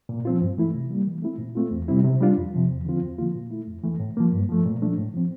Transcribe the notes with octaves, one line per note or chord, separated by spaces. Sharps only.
A#2
F3 C4 F4
G2
E3 A3 E4
C3
G3 A#3
E3
A3 C4 E4
A#2
A3 C4 F4
E2
C3 G3 C4 E4
C3
G3 D4 F4
F2
C3 F3
E2
D3 F3 C4 F4
E2
D3 F3 A#3 F4
A#2
A3 E4
F2
E3 A3
A2
F3 A#3
G2
F3 A3
A#2
F3 A3 D4
A2
F3 C4